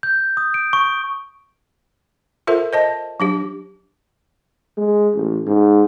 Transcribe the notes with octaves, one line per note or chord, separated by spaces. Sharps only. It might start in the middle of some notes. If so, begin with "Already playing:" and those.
G6
D#6
D7
C#6
F4 A4 A#4 C5 E5
C5 D#5 A5
F#3 D4 G4
G#3
A1
G#2